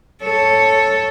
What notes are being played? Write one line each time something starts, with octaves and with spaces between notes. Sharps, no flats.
A4 C#5